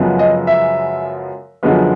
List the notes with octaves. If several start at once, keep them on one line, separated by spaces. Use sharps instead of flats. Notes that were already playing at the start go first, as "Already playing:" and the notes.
Already playing: F#2 C#3 F3 G#3 B3
D#5
E5
F#2 D3 F3 G#3 B3